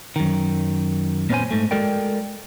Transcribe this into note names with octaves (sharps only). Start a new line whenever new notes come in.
F#2 D#3
A#2 B3 C#4 F4 C5 G#5
G#2 A3
G#3 F#4 A4 A#4 D5 G5